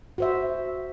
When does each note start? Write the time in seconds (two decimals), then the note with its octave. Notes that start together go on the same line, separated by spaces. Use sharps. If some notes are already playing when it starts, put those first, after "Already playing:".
0.18 F#4 C5 E5